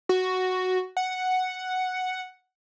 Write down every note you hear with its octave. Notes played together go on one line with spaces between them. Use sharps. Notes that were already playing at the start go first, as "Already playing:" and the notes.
F#4
F#5